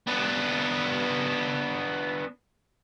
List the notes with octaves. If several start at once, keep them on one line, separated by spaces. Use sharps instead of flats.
B3 D4